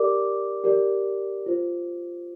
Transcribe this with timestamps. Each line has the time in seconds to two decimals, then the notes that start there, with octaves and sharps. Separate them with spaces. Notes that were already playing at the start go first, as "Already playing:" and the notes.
Already playing: G4 A#4 D5 D6
0.64 G4 A#4 D5
1.46 F4 C5